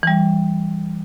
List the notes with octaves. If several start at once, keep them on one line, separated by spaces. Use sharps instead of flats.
E3 G3